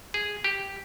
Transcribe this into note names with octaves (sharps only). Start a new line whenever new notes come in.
G#4
G4